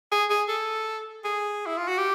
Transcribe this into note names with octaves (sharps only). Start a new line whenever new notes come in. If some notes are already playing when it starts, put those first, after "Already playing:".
G#4
G#4
A4
G#4
E4
F4
F#4
G4